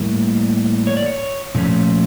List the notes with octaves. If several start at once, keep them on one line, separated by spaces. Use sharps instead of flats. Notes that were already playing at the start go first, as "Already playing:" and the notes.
Already playing: A2 E3 G3 A#3
C#5
D5
C#5
A#2 F3 A3 C#4